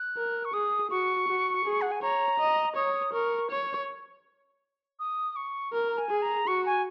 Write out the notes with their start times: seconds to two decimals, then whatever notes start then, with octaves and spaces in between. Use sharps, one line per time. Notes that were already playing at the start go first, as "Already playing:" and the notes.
Already playing: F#6
0.17 A#4
0.45 C#6
0.54 G#4 D#6
0.91 F#4 C#6
1.28 F#4
1.65 G#4
1.81 F#5
1.92 G#5
2.02 C#5 A#5
2.39 D#5
2.76 C#5 D#6
3.13 A#4 C#6
3.50 C#5
4.99 D#6
5.36 C#6
5.73 A#4
5.88 A#5
5.98 G#5
6.10 G#4
6.22 A#5
6.47 F#4 C#6
6.66 G#5